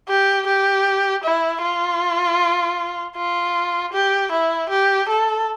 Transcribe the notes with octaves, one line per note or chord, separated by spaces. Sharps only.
G4
G4
E4
F4
F4
G4
E4
G4
A4